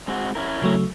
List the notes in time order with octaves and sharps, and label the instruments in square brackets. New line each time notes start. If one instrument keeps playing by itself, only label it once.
[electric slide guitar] G#3 C4 F#4
C#4 E4 A#4
[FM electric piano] C#3 F#3 A3